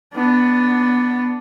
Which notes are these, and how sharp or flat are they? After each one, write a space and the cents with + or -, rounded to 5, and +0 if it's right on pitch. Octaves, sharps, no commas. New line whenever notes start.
B3 +0 D4 +0